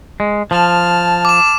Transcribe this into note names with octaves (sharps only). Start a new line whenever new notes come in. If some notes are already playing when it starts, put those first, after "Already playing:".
G#3
F3 A5 F6
D6 E7